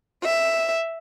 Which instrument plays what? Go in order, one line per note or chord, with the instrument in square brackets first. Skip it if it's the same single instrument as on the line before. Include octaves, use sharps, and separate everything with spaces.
[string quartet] E5